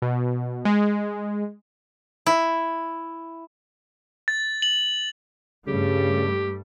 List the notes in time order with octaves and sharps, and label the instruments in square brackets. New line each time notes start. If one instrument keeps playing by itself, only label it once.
[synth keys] B2
G#3
[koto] E4
[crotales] A6
F#7
[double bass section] G2 G3 A3 [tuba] C#3 [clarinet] G4